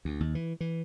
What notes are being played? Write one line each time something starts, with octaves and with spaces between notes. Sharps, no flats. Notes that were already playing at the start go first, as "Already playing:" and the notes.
D2
D#2
E3
E3